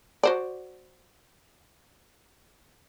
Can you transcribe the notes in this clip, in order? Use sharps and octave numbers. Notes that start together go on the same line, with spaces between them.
F#4 C5 D5